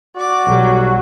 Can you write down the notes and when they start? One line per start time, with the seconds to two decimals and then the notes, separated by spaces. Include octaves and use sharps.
0.16 F#4 D5 D6
0.47 B1 F#3 G3